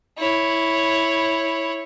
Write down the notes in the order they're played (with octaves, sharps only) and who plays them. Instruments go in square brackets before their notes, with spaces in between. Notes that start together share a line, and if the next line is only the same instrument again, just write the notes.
[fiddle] E4 C#5